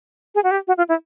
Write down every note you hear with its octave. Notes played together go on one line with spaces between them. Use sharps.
G#4
F#4
G4
F#4
F4
E4